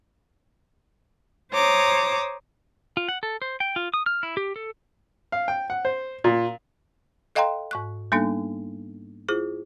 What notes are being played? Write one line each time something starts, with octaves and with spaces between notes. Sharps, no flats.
C5 C#5 A#5 D6 D#6
F4
F#5
A4
C5
G5
F4
D#6
F6
E4
G4
A4
F5
G5
F#5
C5
A#2
A4 D#5 F5 G5 A#5 C6
G#2 C#6 F#6
G3 A#3 B3 D4 D#4 A4
E4 F4 G#4 C5